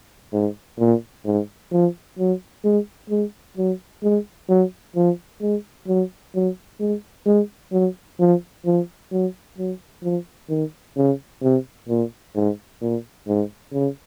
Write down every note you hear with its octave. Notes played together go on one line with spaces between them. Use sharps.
G#2
A#2
G#2
F3
F#3
G#3
G#3
F#3
G#3
F#3
F3
G#3
F#3
F#3
G#3
G#3
F#3
F3
F3
F#3
F#3
F3
D#3
C#3
C3
A#2
G#2
A#2
G#2
C#3